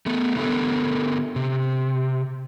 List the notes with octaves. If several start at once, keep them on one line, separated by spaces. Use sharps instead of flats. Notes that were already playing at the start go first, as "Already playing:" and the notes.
A3 B3
D3 B3 A4 A#4
C3